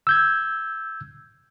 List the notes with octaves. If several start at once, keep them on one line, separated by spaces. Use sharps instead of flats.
E6 G6 G#6